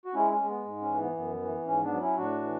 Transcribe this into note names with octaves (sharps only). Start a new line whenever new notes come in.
F#4
G#3 C#4 E4
C#4
G#3
B3
G#2
C#4
E3
B3
F#2 B3
E3
G#2 C#4
B3 D4
F#3
C#4 E4
A2 D4 F#4
E3